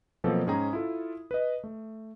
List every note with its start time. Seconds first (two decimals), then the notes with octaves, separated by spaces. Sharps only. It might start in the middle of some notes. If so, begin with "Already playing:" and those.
0.24 B2 F3 F#3 A#3 C4 A4
0.46 G#2 C#4 G#4 G5 A#5 D#6
0.73 E4 F4 A4
1.31 B4 D#5
1.64 A3